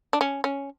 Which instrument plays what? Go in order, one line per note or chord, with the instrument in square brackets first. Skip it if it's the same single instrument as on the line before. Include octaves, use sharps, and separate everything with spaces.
[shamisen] D4
C#4
C#4